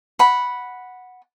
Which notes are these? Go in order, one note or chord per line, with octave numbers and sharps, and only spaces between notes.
F#5 B5